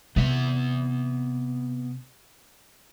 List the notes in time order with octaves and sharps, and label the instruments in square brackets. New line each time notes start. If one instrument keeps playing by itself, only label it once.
[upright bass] C3 [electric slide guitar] B3 E5 F#5